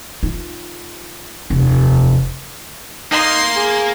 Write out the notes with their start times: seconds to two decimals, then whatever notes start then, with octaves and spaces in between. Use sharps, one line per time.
0.23 D#4 F4
1.50 F1 D#2
3.12 A#3 D#4 C6
3.56 G#4